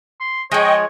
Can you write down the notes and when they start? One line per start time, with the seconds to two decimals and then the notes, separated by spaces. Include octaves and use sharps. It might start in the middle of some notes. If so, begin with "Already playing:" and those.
0.20 C6
0.52 F3 G#3 C#5 D#5 G5 C#6